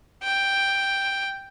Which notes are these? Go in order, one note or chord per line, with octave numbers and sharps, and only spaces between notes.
G5